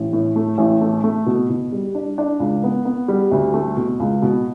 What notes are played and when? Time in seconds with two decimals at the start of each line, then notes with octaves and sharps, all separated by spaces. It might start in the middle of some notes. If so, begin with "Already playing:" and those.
Already playing: A1
0.13 A2
0.36 A3
0.58 A1
0.81 A3
1.04 A3
1.26 B2
1.49 B2
1.72 G3
1.95 D4
2.18 D4
2.40 C#2
2.64 B3
2.85 B3
3.08 G3
3.32 D2
3.54 A3
3.77 B2
4.00 C#2
4.22 B2